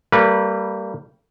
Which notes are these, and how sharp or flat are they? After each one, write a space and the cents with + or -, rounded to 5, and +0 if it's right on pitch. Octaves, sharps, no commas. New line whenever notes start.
G3 -5 A#3 -35 B4 -25